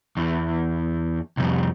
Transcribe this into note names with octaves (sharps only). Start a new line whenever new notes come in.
E2
C2 F2